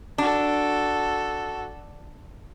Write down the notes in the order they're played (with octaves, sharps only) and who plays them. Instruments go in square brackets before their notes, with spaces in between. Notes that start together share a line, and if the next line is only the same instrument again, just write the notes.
[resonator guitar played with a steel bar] D4 [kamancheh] F#4 A4